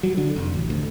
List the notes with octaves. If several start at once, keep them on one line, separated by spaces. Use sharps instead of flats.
F#3
D3
F1
A1
D2